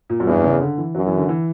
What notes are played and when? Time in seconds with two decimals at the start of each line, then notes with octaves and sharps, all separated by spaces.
0.10 A#2
0.20 F#2
0.26 E2 G2
0.44 C#3
0.61 D3
0.78 E3
0.95 F#2 F#3
1.07 E3
1.17 D3
1.29 E3